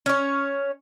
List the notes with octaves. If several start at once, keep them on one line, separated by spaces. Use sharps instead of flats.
C#4 C#5